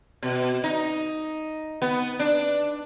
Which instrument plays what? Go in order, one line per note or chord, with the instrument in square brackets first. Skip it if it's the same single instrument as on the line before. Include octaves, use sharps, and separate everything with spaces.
[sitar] B2
D#4
B3
D4